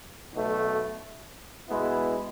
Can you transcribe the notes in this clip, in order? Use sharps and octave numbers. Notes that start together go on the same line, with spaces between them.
B1 B2 A3
B2 G#3 B3 E4